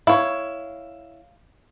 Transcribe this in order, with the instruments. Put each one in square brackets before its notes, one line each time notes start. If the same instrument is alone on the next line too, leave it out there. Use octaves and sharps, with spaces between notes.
[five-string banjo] E4 C#5 [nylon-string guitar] F5